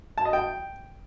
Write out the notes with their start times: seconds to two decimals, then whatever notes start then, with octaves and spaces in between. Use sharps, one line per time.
0.18 A5
0.25 D#5
0.33 G5